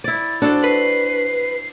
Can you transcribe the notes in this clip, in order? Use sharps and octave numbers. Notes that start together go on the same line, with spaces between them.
E4 D5 A6
D4 F#4 A4 C5 D6
B4 C7